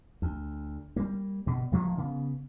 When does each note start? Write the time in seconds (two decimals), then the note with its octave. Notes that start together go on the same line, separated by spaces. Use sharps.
0.22 D2
0.96 G3 A#3
1.46 G2 B2
1.71 D1 G2 F3 A#3
1.98 C#3 B3